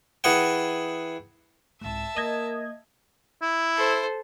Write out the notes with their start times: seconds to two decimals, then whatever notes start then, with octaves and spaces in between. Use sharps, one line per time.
0.24 E3 G#4 F#5 G5
1.81 C2 G#2 E5 A5
2.16 A#3 A#4 D#5 G#6
3.42 E4
3.77 A4 C5